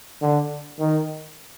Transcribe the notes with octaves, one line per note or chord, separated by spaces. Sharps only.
D3
D#3